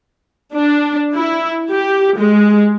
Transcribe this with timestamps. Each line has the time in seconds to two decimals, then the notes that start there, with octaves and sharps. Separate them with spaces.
0.54 D4
1.14 E4
1.70 G4
2.18 G#3